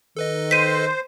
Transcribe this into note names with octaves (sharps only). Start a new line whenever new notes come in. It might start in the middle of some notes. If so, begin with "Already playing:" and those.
D#3 A4 B4 D#5
C5 B6 D#7